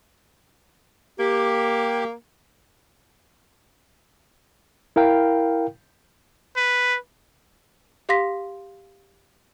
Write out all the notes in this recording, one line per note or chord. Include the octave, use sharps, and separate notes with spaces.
A#3 G4
E4 A#4 F5 G5
B4
G4 F5 C6 A#6 B6